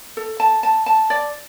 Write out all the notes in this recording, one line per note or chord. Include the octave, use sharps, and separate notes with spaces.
A4
A5
A5
A5
D5